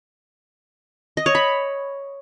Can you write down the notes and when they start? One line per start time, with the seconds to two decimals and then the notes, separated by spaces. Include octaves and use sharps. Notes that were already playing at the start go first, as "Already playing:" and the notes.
1.17 D#5
1.26 C#5
1.35 B5